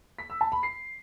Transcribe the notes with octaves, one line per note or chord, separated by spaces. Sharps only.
B6
E6
A5
B5
C7